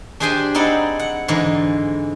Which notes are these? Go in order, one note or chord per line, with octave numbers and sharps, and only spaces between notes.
D4 G4 G#4 C5 G5 G#5
C4 D#4 E4 D5 F#5
F#5
G#2 D3 E3 G#3